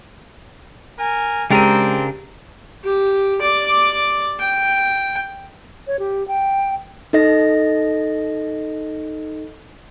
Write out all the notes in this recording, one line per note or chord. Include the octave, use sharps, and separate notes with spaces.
A#4 G#5
C#3 G#3 C4 D4 G4 A#4 A#5 D#7
G4
D5 D6
G5
C#5
G4
G5
D#4 A4 D#5 A#6